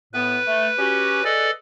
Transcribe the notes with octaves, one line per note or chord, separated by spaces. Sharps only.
A2 B3 B4
A3
C#4 F#4 G4
G#4 A4 B4 D5 D#5